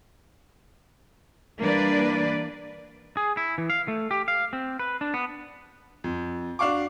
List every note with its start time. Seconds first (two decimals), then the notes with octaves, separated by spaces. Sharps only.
1.59 E3 G3 A#3 D4 B4 D5
3.17 G#4
3.37 E4
3.58 E3
3.70 F5
3.88 A3
4.11 G4
4.28 F5
4.53 C4
4.79 B4
5.01 D4
5.14 B3
6.04 F2
6.59 D4 F#4 F5 C#6 D6